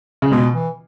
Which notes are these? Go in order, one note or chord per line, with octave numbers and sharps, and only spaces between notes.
C#3
B2 G#3
E3